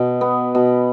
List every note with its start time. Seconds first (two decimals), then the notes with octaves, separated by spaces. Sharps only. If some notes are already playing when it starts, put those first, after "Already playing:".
Already playing: B2
0.21 B3
0.55 B2